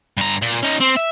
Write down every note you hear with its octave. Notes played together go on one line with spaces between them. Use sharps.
G2 A#5
A#2
C#4 D#4
C4
E5